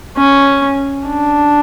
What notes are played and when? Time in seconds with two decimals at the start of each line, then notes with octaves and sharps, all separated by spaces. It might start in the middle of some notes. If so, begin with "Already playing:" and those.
0.17 C#4
1.07 D4